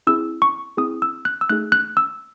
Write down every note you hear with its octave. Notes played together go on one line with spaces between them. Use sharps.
C4 E4 G#4 E6
C#6
C4 E4 G#4 D#6
E6
F#6
E6
A3 D#4 G#4 F#6
F#6
E6